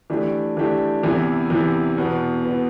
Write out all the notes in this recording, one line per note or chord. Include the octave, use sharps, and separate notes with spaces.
E3 A3 D4 G4
E3 A3 D4 G4
E2 C3 E3
E2 C3 E3
E2 B2 B3
B2 B3